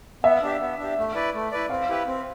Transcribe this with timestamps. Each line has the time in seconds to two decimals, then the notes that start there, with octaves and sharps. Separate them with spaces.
0.24 B3 E5
0.42 D4 G4
0.60 B3
0.79 D4 G4
0.97 A3
1.15 E4 B4 D5
1.34 A3
1.52 E4 B4 D5
1.70 C4 F5
1.89 E4 G4 B4
2.07 C4